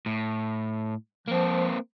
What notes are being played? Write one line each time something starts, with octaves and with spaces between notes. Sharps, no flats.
A2
F3 A#3 C4